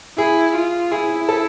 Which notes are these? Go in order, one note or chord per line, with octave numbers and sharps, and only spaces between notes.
E4 G#4
F4
E4 G#4
A4